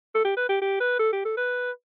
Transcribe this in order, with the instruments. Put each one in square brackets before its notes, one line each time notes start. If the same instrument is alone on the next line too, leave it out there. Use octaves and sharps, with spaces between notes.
[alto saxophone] A4
G4
B4
G4
G4
B4
A4
G4
A4
B4